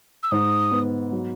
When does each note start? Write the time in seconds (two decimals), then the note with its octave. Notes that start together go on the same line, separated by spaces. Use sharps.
0.23 E6
0.31 G#2 D#6
0.71 B3
1.12 F#3